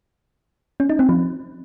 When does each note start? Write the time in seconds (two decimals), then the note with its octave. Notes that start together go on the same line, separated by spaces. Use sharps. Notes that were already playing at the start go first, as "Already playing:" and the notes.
0.80 C#4
0.90 D#4
0.99 C4
1.09 F3